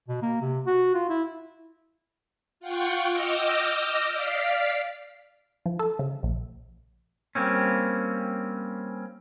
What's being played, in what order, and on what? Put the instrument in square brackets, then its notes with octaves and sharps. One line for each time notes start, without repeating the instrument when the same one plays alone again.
[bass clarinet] B2
A#3
C3
F#4
F4
E4
[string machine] F4 F#5 G5 C#6
D#5 D6 E6 F6 G6 A#6
D5 F5 D6 F6 B6 C7
[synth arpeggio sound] F3
A4
C#3
A#1
[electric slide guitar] G3 A#3 C4 C#4